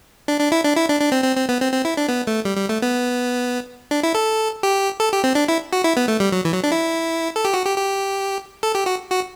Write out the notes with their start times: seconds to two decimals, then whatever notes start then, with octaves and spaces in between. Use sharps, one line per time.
0.28 D4
0.40 D4
0.52 E4
0.65 D4
0.77 E4
0.89 D4
1.01 D4
1.12 C4
1.24 C4
1.36 C4
1.49 B3
1.61 C4
1.73 C4
1.85 E4
1.97 D4
2.09 B3
2.27 A3
2.45 G3
2.57 G3
2.69 A3
2.82 B3
3.91 D4
4.03 E4
4.14 A4
4.63 G4
5.00 A4
5.12 G4
5.24 C4
5.35 D4
5.48 E4
5.73 F#4
5.84 E4
5.97 B3
6.08 A3
6.20 G3
6.32 F#3
6.45 E3
6.53 F#3
6.64 D4
6.72 E4
7.36 A4
7.45 G4
7.54 F#4
7.66 G4
7.78 G4
8.63 A4
8.75 G4
8.86 F#4
9.11 F#4